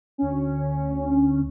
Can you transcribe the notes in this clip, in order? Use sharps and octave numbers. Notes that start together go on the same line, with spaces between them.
D2 C#4